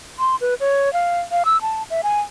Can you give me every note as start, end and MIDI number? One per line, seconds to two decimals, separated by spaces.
0.19 0.36 84
0.41 0.54 71
0.60 0.92 73
0.93 1.20 77
1.32 1.43 77
1.45 1.60 88
1.62 1.83 81
1.90 2.01 76
2.03 2.20 80